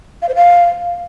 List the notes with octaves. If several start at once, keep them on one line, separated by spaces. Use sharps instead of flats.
F5
C5
F5